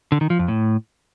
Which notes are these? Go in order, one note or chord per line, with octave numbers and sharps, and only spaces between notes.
D3
D#3
F3
F2
A2